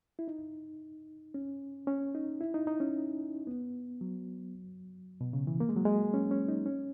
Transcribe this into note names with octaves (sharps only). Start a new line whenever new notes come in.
E4
D#4
C#4
C#4
D#4
E4
D#4
D#4
C#4
B3
F#3
B2
C#3
E3
A#3
G#3
F#3
G#3
C#4
C#4
D#4
C#4